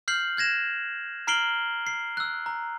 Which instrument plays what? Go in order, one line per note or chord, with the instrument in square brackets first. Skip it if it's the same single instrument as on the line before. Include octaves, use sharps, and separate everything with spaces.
[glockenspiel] F6 G6 C7 F#7
F#6 G#6 A#6 E7
A#5 F6 C7 D7 F#7 G7
C7
E6 F#6
A#5